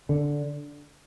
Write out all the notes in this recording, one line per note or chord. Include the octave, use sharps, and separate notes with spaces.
D3